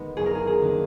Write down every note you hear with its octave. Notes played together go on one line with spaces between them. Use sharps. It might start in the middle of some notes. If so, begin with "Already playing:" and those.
Already playing: D#3 G#3 B3
F#1 G#4
A#4
G#4
G#4
D#3 A#3 D4